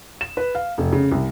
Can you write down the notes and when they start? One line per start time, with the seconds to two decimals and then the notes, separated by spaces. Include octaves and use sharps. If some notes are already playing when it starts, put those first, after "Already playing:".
0.21 E7
0.37 B4
0.55 F5
0.78 F1
0.93 C#3
1.12 C2